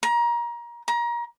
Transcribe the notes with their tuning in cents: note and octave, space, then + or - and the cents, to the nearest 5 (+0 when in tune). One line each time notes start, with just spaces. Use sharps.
A#5 +25
A#5 +30